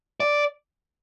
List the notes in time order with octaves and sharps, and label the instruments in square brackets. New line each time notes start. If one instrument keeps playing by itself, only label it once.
[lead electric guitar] D5